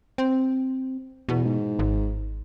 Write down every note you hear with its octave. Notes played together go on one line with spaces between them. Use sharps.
C4
E2 B2
G#2
G#1